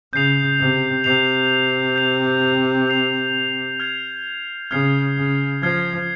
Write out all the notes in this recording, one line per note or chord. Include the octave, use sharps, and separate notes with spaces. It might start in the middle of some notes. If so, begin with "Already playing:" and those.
C#3 G6 C7 F7
C3
C3 G6 C7 F7
G6 C7 F7
G6 C7 F7
F6 G#6 C7
C#3 F6 G#6 C7
C#3
F3 F6 G#6 C7